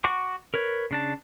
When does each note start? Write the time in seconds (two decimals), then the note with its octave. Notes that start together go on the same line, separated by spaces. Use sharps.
0.04 F#4 F#5 C#6 D6
0.54 A#4 B4 C#5
0.91 C#3 D4 A5